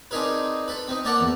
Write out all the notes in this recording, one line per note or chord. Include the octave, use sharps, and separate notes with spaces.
C4 D4 D#4 G#4 A#4 B4
A4 B4
C4 D#4
A#3 A4 A#4 D5 F#5 A5
E2